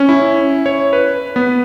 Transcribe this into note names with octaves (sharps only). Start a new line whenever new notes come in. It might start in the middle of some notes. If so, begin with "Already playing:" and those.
Already playing: C#4
E4
C#5
B4
B3